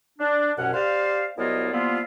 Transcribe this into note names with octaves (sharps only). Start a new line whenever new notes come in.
D4
C2 F#2 B2 C#4 F#5
G4 C5 D5 F5
C2 F#3 B3 E4 F4 D#5
F3 G3 A#3 B3 E4 F4